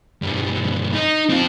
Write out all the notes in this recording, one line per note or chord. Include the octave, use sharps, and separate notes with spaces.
B1 G2
D#4
C4 F4